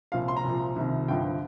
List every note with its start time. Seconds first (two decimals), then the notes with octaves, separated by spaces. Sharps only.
0.12 C2 A#2 F3 F5
0.28 C6
0.37 A#5
0.44 C2 A#2 F3
0.76 C2 C3 D#3
1.08 G1 G2 D3 F3 G5